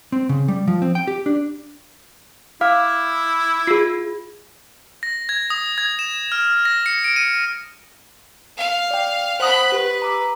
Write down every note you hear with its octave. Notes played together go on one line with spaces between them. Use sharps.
C4
C#3
G3
F3
C4
G5
G4
D4
E4 F5 D6 F6
F4 G#4 C7
A#6
G#6
D#6
G#6
E7
F6
A#6
C#7
D7
D#7
F5
D5 G5
C5 F#5 B5 D#6 F#6
G4 B4
A#5 D6 E6